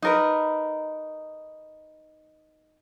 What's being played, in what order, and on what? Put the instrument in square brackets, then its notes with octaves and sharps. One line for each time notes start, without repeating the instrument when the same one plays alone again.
[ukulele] D#4 A#4 B4